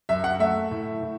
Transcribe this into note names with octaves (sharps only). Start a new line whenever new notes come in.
F#2 E5
F#5
A3 E5
A2
A2